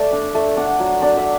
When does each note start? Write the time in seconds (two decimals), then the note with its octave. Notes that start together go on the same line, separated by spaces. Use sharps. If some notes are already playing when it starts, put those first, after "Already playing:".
Already playing: A3 D5
0.13 D4
0.35 A3
0.57 D4 F#5
0.80 F#3
1.02 D4 D5
1.17 E5